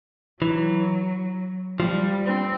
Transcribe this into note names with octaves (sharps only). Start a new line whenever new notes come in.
E3 F#3
F3 G3
C4